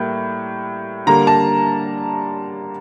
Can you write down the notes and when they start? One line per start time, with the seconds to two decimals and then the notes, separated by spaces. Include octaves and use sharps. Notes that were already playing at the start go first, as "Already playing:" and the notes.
Already playing: A2 G3 A#3
1.07 D3 G3 A#3 A#5
1.27 A5